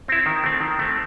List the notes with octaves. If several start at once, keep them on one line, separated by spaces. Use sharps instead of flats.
C4 E4
D#3
A3 C4
D#3
A3 C4